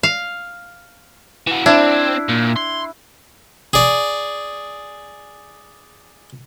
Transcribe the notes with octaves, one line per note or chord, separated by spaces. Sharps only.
F5
E3 F#4
C4 D4 E4
A#2
C6
G#4 D5